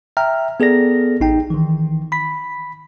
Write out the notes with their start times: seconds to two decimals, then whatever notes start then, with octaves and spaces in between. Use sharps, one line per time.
0.17 E5 G5 A#5 F6
0.60 B3 G#4 A4 D5 A#6
1.20 A1 D#4 G5
1.50 D#3 E3
2.12 B5 B6